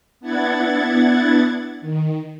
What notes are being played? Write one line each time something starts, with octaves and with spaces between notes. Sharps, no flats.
B3 D4 E4 F#5 G#6 A6
D#3